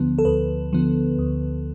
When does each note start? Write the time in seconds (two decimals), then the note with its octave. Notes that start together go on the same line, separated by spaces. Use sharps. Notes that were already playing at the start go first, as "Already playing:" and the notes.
Already playing: D2 D3 F3 B3
0.18 A4
0.25 D2 B4
0.73 D3 F3 B3
1.19 D2